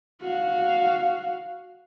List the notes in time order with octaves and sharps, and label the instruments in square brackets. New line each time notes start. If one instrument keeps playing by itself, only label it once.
[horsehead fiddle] F#4 F5